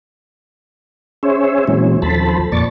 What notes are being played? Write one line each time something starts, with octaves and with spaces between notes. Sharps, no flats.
C#4 G#4 C5 C#5 E5
A#2 E3 F#3 G#3 C4 C#4
D#2 F3 A4 C5 A5 B5
F2 A#2 D5 C#6 A6